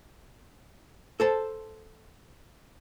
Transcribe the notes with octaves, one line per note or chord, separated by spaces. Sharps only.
A4 C5 A5